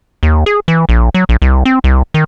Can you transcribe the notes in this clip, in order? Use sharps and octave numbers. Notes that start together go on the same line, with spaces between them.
D#2
G#4
E3
A#1
F#3
A#1
C2
C4
C2
D#3